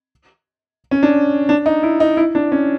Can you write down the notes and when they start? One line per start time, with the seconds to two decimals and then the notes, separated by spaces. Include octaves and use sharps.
0.91 C#4
1.03 D4
1.49 D4
1.66 D#4
1.83 E4
2.00 D#4
2.17 E4
2.35 D4
2.52 C#4